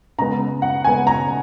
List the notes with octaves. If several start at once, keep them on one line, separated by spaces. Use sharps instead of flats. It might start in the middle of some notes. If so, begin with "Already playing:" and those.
C#3 G#3 B3 A#5
F#5
C#3 G#3 B3 G#5
A#5